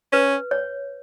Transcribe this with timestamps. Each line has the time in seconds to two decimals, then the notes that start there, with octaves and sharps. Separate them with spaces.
0.12 C#4 B4
0.51 C#5